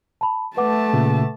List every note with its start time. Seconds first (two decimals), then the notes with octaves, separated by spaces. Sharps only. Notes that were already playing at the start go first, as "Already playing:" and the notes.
0.21 A5 B5
0.57 A3 B4 F#5 A5 D6
0.93 A#2 C#3